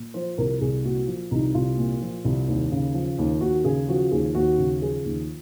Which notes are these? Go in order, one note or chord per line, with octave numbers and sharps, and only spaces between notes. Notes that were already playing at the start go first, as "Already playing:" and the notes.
Already playing: A#2
F3 C5
C2 A#4
C2 G#4
A#2 F#4
F3
C2 D#4
C2 F4
A#2
F3
C2
D#2
C#3
F3
D#2
D#2 F#4
C#3 G#4
F3 F#4
D#2 G#4
D#2 F#4
C#3
F3 G#4
D#2